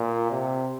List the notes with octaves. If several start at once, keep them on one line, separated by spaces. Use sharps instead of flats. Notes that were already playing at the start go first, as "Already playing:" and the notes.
Already playing: A#2
C3